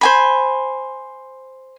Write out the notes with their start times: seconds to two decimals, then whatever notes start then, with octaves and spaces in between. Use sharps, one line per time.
0.01 C5 G#5 B5